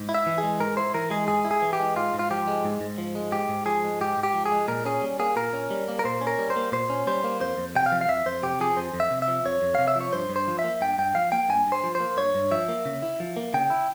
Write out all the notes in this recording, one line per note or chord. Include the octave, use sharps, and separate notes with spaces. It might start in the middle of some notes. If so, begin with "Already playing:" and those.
Already playing: G#2
E4
E5
E3
G#3 G#4
G#2 A#4
E4 C5
E3 A#4
G#3 G#4
G#2 G#4
E4
G#4
E3
G4
G#3
G#2 F4
G#2
F4
F3 G4
G#3
G#2
G#2
F3
G#3
G#2 G4
G#2
F3 G#4
G#3
G#2 G4
G#2
G4
F3
G#4
G#3
A#2 A#4
C#4 G#4
G3
A#3 G#4
A#2 A#4
C#4
G3
A#3
A#4
A#2 C5
C#4
A#4
G3
C5
A#3
A#2 C5
C#4
G3 C5
A#3
F2 C5
F2
C3 G5
F5
F3
F5
F2 E5
F2 C5
C3 G4
F3 G#4
F2 C5
F2
E5
C3
E5
F3
F2 C#5
F2
C3 F5
E5
F3 C#5
G2 C5
G2
C5
F3
E5
A#3
G2 G5
G2 G5
F3 F5
A#3 G5
G2 G#5
G2
C5
F3
C5
A#3
G2 C#5
G2
F3 E5
A#3
C#3
E4
F3
A#3
C#3 G5
E4